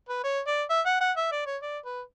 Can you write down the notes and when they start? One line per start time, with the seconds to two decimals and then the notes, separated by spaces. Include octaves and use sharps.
0.09 B4
0.24 C#5
0.47 D5
0.70 E5
0.85 F#5
1.01 F#5
1.17 E5
1.32 D5
1.46 C#5
1.62 D5
1.85 B4